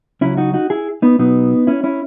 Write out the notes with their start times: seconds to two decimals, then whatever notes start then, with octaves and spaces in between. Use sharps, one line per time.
0.21 C#2 C#3 F#3 C#4 E4
0.37 D#4 F#4
0.54 D#4 F#4
0.70 E4 G#4
1.02 B3 D#4
1.19 B1 B2 F#3 B3 D#4
1.67 C#4 E4
1.84 C#4 E4